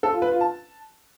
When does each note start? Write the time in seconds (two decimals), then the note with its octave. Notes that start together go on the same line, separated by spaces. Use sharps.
0.03 A4
0.13 F4
0.22 B4
0.31 F4
0.41 A5